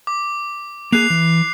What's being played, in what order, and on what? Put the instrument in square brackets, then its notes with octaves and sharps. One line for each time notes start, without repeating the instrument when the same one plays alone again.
[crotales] D6
[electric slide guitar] A#3 G#4 [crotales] F#6 C7 F7
[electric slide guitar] E3